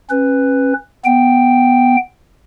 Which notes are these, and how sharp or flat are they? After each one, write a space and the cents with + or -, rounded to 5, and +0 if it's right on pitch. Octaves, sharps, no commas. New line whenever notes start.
C#4 -30 B4 +5
B3 +0 G5 +0